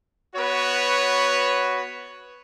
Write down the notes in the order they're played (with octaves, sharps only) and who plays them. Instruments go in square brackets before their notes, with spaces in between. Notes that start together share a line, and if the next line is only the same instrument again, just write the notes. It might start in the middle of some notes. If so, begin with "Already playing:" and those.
[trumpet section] B3 F#4 B4 C#5